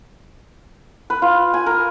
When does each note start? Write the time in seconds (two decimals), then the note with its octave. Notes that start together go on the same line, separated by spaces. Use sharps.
1.10 B4
1.22 F4
1.54 G#5
1.66 A#4